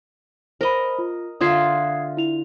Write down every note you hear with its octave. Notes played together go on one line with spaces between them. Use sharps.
A#4 C5 D#5 B5
F4
D3 F4 E5 D#6 G#6 C7
E4 F7